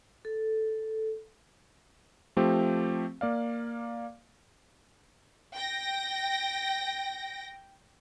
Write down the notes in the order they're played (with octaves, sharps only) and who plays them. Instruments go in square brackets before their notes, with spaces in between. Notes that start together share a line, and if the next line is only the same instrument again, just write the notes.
[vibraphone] A4
[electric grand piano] F3 A3 C4 G4
A#3 D5 F5
[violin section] G5 A#6